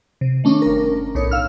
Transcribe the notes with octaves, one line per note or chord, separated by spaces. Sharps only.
C3
D#3 A3 C#4 D4
G1 A#4
B1 A2 D#4 C#5 C#7
F5 E6 F6